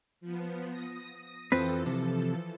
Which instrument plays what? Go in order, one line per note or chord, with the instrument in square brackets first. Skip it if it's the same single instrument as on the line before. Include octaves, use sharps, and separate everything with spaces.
[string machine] F3 B3
D#6 A#6
[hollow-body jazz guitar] F2 C4 B4 [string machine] E3 F3 A4
[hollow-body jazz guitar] C3